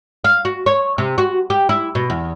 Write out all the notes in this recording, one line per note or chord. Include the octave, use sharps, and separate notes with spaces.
F5
F#4
C#5
C3
F#4
G4
E4
B2
E2